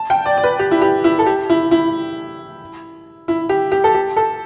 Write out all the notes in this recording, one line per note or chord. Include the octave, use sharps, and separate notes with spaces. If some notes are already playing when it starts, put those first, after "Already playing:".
Already playing: A5
G5
D5
D5
B4
G4
E4
G4
E4
A4
G4
E4
E4
E4
G4
G4
A4
G4
A4